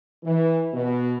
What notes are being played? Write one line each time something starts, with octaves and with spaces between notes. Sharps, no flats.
E3
B2